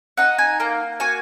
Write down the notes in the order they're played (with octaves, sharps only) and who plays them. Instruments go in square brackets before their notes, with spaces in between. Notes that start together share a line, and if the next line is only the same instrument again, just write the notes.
[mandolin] D#4 F#5
G#5
A#3 A#5
F#4 G#5